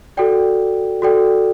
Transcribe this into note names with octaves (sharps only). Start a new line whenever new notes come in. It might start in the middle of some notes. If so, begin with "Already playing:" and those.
F#4 A4 D5 G5
F#4 A4 D5 G5